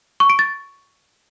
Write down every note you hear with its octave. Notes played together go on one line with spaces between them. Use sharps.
C#6
D7
A6